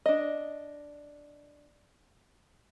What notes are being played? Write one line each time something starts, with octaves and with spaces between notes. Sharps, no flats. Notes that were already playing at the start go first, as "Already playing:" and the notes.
D4 D#5